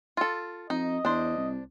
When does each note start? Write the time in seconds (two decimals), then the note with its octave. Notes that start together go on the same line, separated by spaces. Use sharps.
0.17 F4 A4
0.70 F2 D#4 D#5
1.05 E2 D4 C5
1.37 C2